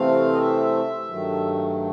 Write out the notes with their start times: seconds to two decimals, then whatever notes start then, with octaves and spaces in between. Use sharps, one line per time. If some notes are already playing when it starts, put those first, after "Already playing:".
Already playing: C3 E3 A3 C4 F5
0.33 D#5
0.38 E5
1.09 G2 D#3 F#3 A3